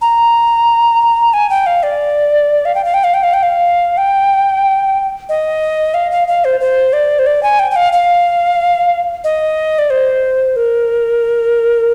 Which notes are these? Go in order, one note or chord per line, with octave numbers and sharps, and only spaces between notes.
A#5
G#5
G5
F5
D5
F5
G5
F5
G5
F5
G5
F5
G5
F5
G5
D#5
F5
F5
F5
C5
C5
D5
C5
D5
G#5
G5
G5
F5
F5
D#5
D5
C5
A#4